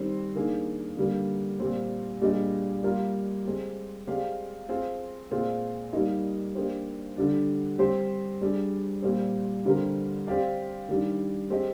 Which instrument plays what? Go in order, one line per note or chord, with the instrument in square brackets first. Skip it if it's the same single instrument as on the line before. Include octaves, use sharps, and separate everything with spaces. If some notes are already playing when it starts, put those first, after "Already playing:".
Already playing: [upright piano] D#3 G3 C4
D#3 A#3 D4 G#4
D3 G3 A#3
A#2 G3 C4
A#2 G3 D4 G#4 D#5
G3 A#3 F4 A#4
G#3 C4 G4
G#3 C4 G4 D5 F5
C4 F4 G#4
A#2 G#3 C4 F4 G#4
G3 A#3 D#4
A#3 D4 G4 C5
D3 G3 D4
G3 C4 G4 C5
G3 D4 G#4
A#2 G3 C4
D3 G3 C4 G4 A#4
C4 G4 D5 F5
D#3 G3 D4
G#3 C4 G4 C5 D#5